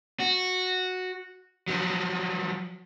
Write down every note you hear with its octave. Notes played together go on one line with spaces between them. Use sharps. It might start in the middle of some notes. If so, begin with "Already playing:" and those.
F#4
F3 F#3